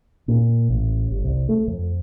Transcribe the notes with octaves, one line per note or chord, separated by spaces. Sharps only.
A#2
A1
G1
C2
A3
F2